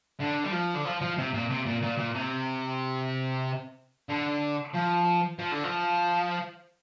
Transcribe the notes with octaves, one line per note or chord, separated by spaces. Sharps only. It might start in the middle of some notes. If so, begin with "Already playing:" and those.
D3
G3
F3
D3
F3
F3
C3
A#2
C3
A#2
A#2
A#2
C3
D3
F3
F3
D3
F3